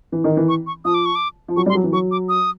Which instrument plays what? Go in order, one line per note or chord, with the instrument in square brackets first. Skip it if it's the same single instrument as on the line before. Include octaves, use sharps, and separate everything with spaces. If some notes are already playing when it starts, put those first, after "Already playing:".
[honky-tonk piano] E3
D#3
E3
[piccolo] C#6
C#6
[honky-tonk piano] F3 [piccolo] D#6
[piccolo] D6
C#6
D6
[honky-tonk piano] F3
[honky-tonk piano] F#3 [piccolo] C#6
[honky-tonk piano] G3
[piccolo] C6
[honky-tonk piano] F#3
E3
[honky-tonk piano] F#3 [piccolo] C#6
[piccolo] D6
D#6